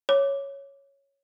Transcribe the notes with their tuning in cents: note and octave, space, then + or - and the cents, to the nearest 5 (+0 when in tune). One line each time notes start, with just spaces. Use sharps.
C#5 +0 D6 +0